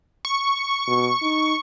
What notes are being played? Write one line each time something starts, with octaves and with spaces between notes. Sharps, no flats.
C#6
B2
D#4